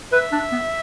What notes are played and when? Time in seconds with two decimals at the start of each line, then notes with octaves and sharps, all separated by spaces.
0.12 B4 E5
0.32 D4
0.52 B3